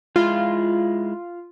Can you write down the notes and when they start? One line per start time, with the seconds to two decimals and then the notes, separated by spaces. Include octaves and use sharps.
0.16 G#3 E4 F4